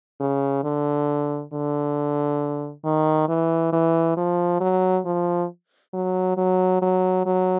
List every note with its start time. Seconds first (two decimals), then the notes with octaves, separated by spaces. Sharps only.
0.20 C#3
0.64 D3
1.53 D3
2.85 D#3
3.28 E3
3.73 E3
4.17 F3
4.60 F#3
5.05 F3
5.93 F#3
6.37 F#3
6.82 F#3
7.26 F#3